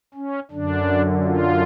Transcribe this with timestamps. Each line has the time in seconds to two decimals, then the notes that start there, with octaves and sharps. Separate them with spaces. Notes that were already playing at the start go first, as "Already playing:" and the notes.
0.14 C#4
0.51 F#2 D3 D4
1.24 F4